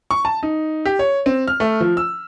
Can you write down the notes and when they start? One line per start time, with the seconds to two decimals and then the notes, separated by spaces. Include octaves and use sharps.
0.11 C#6
0.25 A5
0.43 D#4
0.86 G4
0.99 C#5
1.26 C4
1.48 F6
1.60 A3
1.80 F3
1.97 E6